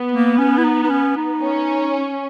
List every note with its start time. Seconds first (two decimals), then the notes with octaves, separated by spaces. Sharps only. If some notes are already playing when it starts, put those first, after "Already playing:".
Already playing: B3
0.12 A#3
0.38 C#4
0.58 E4
0.64 D#4
0.83 D#4
0.89 C#4
1.17 D#4
1.42 C#4